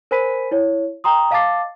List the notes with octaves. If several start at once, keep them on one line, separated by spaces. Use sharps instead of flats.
A#4 C5 G#5 B5 B6 D#7
E4 C#5
G5 A#5 C6 D#6
D#5 F5 A5 D6 A6 C7